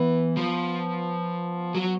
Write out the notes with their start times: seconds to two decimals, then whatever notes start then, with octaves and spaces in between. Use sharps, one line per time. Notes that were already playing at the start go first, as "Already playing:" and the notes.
Already playing: E3 B3
0.37 F3
1.75 F#3